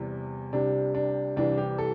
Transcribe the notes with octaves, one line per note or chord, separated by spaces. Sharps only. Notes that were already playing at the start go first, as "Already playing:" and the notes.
Already playing: E2 C3 G3
C2 C3 G3 D4
D4
C2 C3 E3 G3 D4
G4
A4